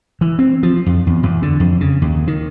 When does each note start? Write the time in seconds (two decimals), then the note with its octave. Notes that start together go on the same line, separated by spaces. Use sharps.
0.21 E3
0.39 C4
0.63 F3
0.86 F2
1.07 E2
1.23 E2
1.42 D3
1.60 F2
1.81 C#3
2.02 D#2
2.27 D#3